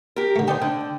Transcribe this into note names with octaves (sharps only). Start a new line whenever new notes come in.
G4 A#4
D3 A3
D#4 C5 D5 G5 A5
D3